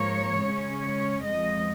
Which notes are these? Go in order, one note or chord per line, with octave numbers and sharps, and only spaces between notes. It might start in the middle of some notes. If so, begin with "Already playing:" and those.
Already playing: G#2 F3 A#3 C#5
C#3 G#3 C#4
C#5
F2 F3 G#3 D#5